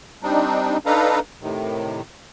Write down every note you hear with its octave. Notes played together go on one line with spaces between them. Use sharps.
G3 C4 D4 D#4
D4 D#4 A4 B4 F5 A#5
A2 C3 D#3